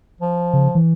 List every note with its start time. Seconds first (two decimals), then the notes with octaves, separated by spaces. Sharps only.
0.21 F3
0.53 C#3
0.75 E3